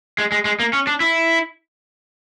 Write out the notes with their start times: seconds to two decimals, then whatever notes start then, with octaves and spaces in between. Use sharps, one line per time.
0.18 G#3
0.32 G#3
0.45 G#3
0.60 A#3
0.73 C#4
0.87 D4
1.00 E4